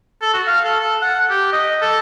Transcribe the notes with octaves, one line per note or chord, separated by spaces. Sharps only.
A4
F#4
F5
A4
A4
F#5
G4
D#5
A4